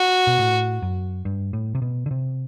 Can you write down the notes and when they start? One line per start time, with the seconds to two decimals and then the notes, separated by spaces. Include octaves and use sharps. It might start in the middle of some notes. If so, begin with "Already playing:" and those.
Already playing: F#4
0.27 B2
0.39 A2
0.82 F#2
1.25 G2
1.53 A2
1.75 C3
1.82 B2
2.06 D3
2.11 C3